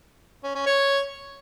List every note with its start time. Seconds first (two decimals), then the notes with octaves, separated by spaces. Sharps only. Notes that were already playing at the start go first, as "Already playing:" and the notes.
0.44 C#4
0.55 C#4
0.66 C#5